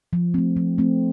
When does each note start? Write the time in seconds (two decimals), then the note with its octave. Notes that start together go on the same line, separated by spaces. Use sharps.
0.13 F3
0.34 A3 C4
0.57 F3
0.78 A3 C4